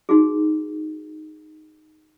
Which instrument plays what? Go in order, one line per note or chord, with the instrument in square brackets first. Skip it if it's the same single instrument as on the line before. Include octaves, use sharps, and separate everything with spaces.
[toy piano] D#4 F#4 G#4